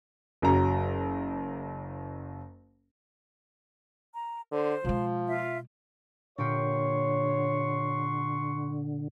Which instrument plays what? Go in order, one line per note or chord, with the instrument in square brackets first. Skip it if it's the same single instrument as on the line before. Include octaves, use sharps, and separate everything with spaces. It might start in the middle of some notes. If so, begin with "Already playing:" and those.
[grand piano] F#1 F#3 A#5
[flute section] A#5
[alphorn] D3 [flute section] C5
[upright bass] B2 G#3 [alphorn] F3
[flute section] F4 E5
[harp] A#2 A#3 G4 [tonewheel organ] D3 [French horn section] C#5 [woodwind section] F#5 C6 C#6